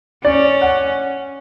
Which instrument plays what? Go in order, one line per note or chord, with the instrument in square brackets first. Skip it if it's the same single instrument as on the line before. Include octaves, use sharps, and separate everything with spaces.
[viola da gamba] C#4 [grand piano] D5
[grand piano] F#5